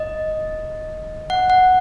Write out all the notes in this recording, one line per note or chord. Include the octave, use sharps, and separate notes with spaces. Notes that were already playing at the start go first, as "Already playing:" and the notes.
Already playing: D#5
F#5
F#5